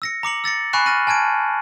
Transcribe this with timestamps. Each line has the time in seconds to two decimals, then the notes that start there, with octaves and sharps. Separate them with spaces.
0.02 E6 A#6 C#7
0.23 A#5 D6 C#7 F#7
0.44 E6 A6 A#6 C#7
0.73 G#5 B5 C#6 F#6 C7 E7
0.86 F6 A6 A#6 D#7 F#7
1.07 G#5 A5 F6 G#6 D7 D#7